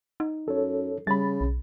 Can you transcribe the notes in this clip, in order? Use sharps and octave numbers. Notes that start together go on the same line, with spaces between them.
D#4
F#2 A4 C#5
C#3 G3 B5 A6
B1